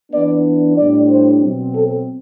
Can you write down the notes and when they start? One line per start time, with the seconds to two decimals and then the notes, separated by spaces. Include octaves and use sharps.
0.11 E3 B3 D4 D5
0.77 A2 G3 D4 D5
1.09 C5
1.42 B2 F#3 C4
1.74 A4